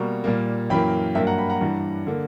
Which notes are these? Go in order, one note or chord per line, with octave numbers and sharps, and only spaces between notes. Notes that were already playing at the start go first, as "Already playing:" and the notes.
Already playing: B2 G3 A#3 A#5 C#6
A#2 G3 A#3
F#2 E3 A#3 G5 B5
G2 F#3 A#3 E5 G5
F#5 A#5
G5 B5
F#5 A#5
G2 E3 G3
D3 A#3